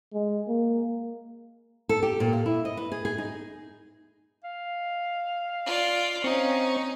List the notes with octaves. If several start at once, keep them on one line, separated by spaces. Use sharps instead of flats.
G#3
A#3
A4
G4
A#2
F5
E4
D#5
B4
G#4
G#4
D#4
F5
F4 D5
C4 C#4 D#4 C#6